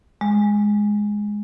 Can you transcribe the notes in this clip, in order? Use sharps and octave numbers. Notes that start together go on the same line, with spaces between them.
G#3